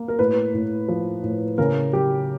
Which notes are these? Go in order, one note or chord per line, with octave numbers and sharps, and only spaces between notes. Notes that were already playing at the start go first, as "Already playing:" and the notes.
Already playing: A#3
A#4
A2 B4
A2
F3
A2
C#3 A#4
F#3 G4